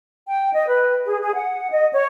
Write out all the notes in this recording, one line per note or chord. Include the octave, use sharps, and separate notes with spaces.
G5
D#5
B4
G#4
G#4
F#5
D#5
C#5